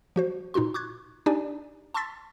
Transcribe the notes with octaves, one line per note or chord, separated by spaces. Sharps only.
F3 F#4 C5
A#2 D#4 F4 F#4 C6
C#6 D6 F#6 G#6
D4 D#4 G4 D5 G#5
A5 C6 C#6 E6 A6 B6